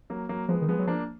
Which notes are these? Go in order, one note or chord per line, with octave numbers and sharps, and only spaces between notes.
F#3 A#3
F#3 A#3
F3 G#3 B3
D#3
F3 G#3 B3
F#3
F3 A#3 D4